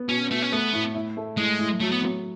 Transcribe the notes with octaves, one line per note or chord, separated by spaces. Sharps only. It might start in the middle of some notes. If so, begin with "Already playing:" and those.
Already playing: B3
B2 C#4
B2 A3
C#4
A3 B3
A2
E4
A3
A2 G#3
A2
F#3 A3
B3
F#3